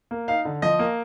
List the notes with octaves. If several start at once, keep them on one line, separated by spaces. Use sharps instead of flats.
A#3
D#4 F5
D3
F3 D#5
A#3